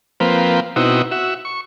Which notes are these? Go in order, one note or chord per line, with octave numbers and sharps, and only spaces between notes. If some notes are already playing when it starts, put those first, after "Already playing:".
F3 A#3 C4 B4
B2 C4 D#4 E4 F#4
F#4 E5
C#6